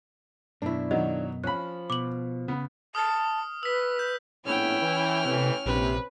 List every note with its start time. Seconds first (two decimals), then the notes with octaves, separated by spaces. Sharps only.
0.62 F#2 B2 D4 E4
0.91 D#3 F#3 D#5
1.44 F3 C#4 B5 F#6
1.90 B2 D6 F#7
2.48 C#3 B3
2.95 A5 D#6 F6
3.63 B4 E6 B6
3.99 G6
4.45 A#1 A2 B3 C#4 E4 G5 F6
4.81 E3
5.25 A1 C3 E3
5.66 A#1 C3 B4